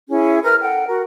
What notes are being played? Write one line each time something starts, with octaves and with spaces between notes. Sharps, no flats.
C#4 E4 G#4
A#4 B4 F6
A4 F#5 G5
F#4 A#4